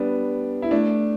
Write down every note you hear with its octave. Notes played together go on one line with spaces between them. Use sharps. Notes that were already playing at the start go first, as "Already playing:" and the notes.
Already playing: G3 B3 D4
E4
A3 D4